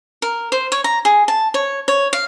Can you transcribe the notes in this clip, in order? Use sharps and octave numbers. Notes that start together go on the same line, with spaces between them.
A#4
C5
C#5
A#5
G#4
A5
C#5
C#5
F5